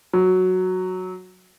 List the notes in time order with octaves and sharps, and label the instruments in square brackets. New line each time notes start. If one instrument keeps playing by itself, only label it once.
[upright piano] F#3